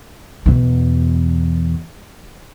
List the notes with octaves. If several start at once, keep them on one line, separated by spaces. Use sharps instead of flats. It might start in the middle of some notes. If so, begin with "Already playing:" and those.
E2 B2